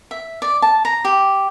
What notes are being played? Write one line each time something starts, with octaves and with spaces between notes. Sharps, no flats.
E5
D5
A5
A#5
G4